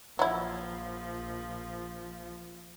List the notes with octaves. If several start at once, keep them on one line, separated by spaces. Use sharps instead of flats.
A#1 F3 F#3 E4